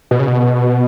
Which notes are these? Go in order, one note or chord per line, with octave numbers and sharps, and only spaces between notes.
B2
C#3
B2